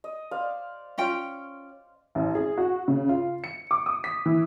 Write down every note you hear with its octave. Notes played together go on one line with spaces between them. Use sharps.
D#5
C5 D5 F5
C#4 F4 G5
A1
G#4
F#4
C#3
F4
C#7
D6
D#6
B6
E3